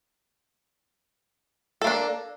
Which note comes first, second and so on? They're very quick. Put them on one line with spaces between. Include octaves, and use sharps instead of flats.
A4 A#3 D4